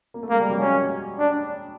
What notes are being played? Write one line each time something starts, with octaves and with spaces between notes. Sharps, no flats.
A#3
A3
G#3 A#3
G3
F#3
G#3 C#4
D4